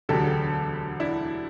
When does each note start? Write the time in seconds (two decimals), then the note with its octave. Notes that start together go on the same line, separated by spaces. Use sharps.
0.09 E1 D2 D3 F#3 G4 A4
1.00 D4 E4